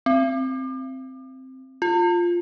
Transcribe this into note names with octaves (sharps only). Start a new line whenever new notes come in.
C4
F4